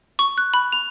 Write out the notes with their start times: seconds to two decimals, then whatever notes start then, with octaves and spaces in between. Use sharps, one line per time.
0.19 C#6
0.38 F#6
0.54 B5
0.72 F7